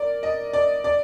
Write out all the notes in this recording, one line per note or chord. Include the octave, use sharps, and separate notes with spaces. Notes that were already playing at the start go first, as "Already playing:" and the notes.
Already playing: A#4 D5
D#5
D5
D5